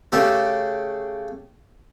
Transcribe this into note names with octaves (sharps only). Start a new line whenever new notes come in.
C#3 A3 G4 A4